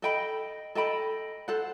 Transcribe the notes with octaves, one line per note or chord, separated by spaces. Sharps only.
A4 D#5 G5 B5
A4 D#5 G5 B5
A4 C5 F#5